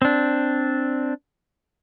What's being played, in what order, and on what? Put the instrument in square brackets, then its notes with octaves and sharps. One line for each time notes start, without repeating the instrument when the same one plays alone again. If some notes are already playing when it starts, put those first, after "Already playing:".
[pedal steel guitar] C4 D4